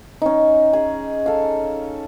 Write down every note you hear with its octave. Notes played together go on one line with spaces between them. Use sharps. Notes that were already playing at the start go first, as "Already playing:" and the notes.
C#4 D#4
G#4
A4 F5